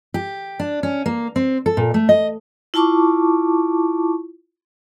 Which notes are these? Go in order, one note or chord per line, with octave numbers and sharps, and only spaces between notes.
G4
D4
C#4
A#3
C4
A4
A#2
A3
D#5
E4 F4 A5 C#6 D6